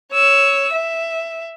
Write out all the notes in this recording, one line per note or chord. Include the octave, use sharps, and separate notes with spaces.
C#5 E6
E5